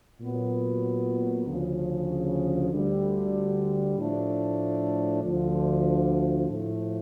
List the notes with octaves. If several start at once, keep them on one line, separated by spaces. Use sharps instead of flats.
A#2 F#3 B3
D2 C#3 F3
D2 D3 G3
A2 F3 A3 D4
D2 D3 F3
A2 F3 A3